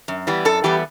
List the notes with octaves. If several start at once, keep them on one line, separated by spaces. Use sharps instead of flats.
F#2
E3 G3 B3
F#2 A4
E3 G3 B3 G4